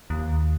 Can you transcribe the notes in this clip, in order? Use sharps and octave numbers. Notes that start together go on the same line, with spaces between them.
D#2